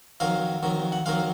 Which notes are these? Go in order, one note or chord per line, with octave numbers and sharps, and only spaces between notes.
F2 D#3 F#3 F5
F2 D#3 F#3
F#5
F2 D#3 F#3 F5